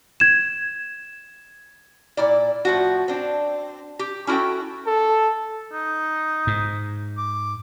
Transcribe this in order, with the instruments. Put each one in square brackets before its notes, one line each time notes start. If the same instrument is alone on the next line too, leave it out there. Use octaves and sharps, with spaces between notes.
[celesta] G#6 E7
[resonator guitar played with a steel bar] A#2 E4 D5
A2 F3 F#4
C4 D4
G4
C#4 E4 F#4 A4 G5
[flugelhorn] A4
[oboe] D#4
[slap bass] G#2
[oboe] D6